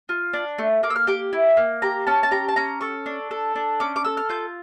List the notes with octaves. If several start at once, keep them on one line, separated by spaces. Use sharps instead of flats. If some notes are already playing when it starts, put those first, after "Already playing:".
F4
D4
A3
A#3 D6
E6
F6
G4 D6
E4
A#3
G4 A#5
C#4 A5
A5
G4 A#5
A5
C#4 A#5
A4 C#6
D4
A4
D4
C#4 D6
D6
A4 E6
F6
F4 G6